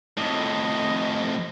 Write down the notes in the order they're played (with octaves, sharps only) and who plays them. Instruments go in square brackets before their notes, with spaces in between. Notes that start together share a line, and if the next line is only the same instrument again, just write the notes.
[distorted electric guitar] F2 A2 [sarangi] D#5